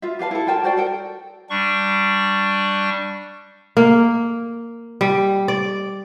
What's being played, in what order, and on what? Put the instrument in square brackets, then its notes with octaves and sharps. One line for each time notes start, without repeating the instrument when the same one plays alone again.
[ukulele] F4 E5
G4 B4 F5 A5
E4 A4
F4 A#4 G5 A5
F#4 C5 D5 G5
A4 A#4 G5
[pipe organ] G3 D4 C#6
[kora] A#3
G3
D5